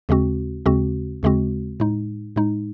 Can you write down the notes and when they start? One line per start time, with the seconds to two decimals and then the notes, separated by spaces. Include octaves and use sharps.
0.09 D#2 C#3 G#3 C4 F#4
0.66 D#2 C#3 G#3 C4 F#4
1.23 D#2 C#3 G#3 C4 F#4
1.80 A2 G#3 D#4
2.36 A2 G#3 D#4